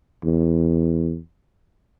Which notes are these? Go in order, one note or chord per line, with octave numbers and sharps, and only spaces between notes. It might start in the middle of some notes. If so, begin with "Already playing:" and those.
E2